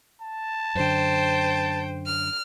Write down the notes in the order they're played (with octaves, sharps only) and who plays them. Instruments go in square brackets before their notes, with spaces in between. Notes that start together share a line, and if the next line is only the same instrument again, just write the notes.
[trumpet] A5
[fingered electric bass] F#2 D3 [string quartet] C5 G5
[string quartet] F6